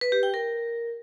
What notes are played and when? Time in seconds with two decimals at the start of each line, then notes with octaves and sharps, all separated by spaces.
0.01 B4
0.12 G4
0.23 G5
0.34 A#4